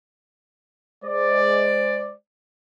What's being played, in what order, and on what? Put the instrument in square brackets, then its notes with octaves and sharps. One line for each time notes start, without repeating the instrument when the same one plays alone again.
[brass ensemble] G#3 C5 D5